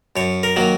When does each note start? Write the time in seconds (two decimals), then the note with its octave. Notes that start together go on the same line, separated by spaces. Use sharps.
0.16 F#2 C#5
0.43 A#4
0.56 D#3 F#3 A#3